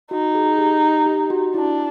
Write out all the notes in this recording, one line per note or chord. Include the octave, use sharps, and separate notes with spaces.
D#4 F#4
G#4
G4
G4
F#4
D4 E4